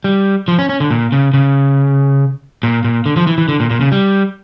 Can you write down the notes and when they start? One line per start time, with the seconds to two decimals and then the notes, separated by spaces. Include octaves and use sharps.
0.04 G3
0.48 F3
0.59 C#4
0.69 C#4
0.80 D3
0.91 A#2
1.12 C#3
1.34 C#3
2.63 A#2
2.84 A#2
3.06 D3
3.17 F3
3.27 E3
3.38 E3
3.48 D3
3.60 A#2
3.70 A#2
3.81 C#3
3.92 G3